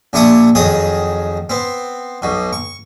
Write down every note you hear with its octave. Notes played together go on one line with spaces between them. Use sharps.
A#1 D4 E4 C#6 D#6
F2 D#3 F#3 G#4 D#6
B3 C4
B1 B2
C#6